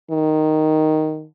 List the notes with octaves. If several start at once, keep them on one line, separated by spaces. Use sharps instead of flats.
D#3